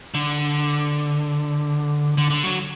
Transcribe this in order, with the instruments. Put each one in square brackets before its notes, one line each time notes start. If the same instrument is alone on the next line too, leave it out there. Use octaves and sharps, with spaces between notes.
[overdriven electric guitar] D3
D3
D3
F#3